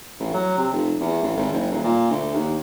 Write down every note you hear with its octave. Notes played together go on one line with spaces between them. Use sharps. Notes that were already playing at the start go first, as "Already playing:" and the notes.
A1
F#3
C3
F1
E2
A1
G#1
F#1
D#1
A#2
D2
D#2